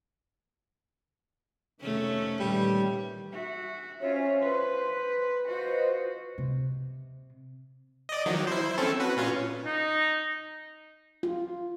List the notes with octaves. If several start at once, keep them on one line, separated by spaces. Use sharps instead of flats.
F2 C3 D#3 A3 C#4
A#2 D#3 E3 G3
F#4 E5
C#4 F4 C5 C#5 E5
B4 C5 C6
F4 F#4 B4 C5 D#5
C3
D5 D#5
D#3 F3 F#3
E4 C5
C4 C#4 A4
F#4 B4
A#2 C#4 F4
D#4
F4